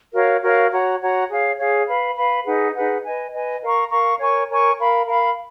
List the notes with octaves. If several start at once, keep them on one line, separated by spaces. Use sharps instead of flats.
F#4 A#4 C#5 F5
F#4 A#4 C#5 F5
F#4 C#5 F#5 A#5
F#4 C#5 F#5 A#5
G#4 C#5 F5
G#4 C#5 F5
B4 F5 B5
B4 F5 B5
D#4 G#4 B4 F#5
D#4 G#4 B4 F#5
B4 D#5 G#5
B4 D#5 G#5
A#4 F5 A#5 C#6
A#4 F5 A#5 C#6
A#4 C#5 G#5 C#6
A#4 C#5 G#5 C#6
A#4 F5 B5
A#4 F5 B5